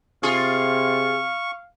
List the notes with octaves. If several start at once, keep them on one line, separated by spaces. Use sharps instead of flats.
C3 F4 G#4 F5 C#6